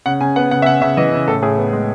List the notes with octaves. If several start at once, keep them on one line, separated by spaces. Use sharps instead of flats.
C#3 F#5
C#3 G#5
B3 F#5
C#3 F#5
E5
C#3 F#5
C#3 E5
E3 D#5
C#3
A2 A4
A2 G#4
B3
G#3